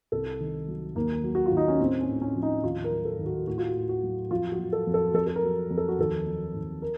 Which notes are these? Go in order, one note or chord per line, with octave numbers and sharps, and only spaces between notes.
C2 A4
D#3
F#3
D#2 A#3
F#3
F#4
F4
D#2
D#4
C#4
A2 C4
C#4
A2
C#4
F3
D#4
D#2 F4
A#4
F#3
A4
D#2
F#4
A2 F#4
F4
F#4
A2
F#4
F#3
F2 F4
F#4
F#3
A4
F2
A4
F2 A4
A4
A#4
F#3
F2
A4
F#4
D#2 A4
F#3
D#2
A#4